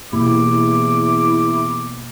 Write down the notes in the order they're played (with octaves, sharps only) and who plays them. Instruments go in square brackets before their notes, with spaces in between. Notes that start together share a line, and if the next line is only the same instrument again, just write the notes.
[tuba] E2 [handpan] B2 A#3 G4 [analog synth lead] E4 [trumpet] D6